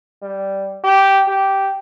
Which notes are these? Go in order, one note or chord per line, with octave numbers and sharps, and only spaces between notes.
G3
G4
G4